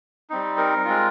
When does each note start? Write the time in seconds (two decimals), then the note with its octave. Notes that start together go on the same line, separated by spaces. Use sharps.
0.30 G3 C4 D#4
0.58 A#4
0.85 G#3 C4 F4